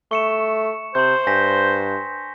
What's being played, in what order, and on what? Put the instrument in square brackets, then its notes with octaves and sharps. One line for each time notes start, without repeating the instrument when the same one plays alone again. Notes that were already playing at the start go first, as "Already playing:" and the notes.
[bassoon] A3 [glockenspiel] C#6 C#7 E7
[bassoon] C3 [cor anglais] C5 [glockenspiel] C6 G6
[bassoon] G2 [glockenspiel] G#5 A#6 B6